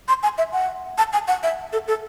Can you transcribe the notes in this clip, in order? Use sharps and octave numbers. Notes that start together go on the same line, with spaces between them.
C6
G#5
E5
F#5
A5
G#5
F#5
E5
A4
A4